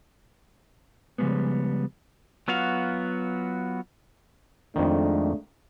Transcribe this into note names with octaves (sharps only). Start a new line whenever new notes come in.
C#3 F3 G3 G#3 B3
F#3 B3 F4 F#4 F5
F2 D#3 G#3 A3 D4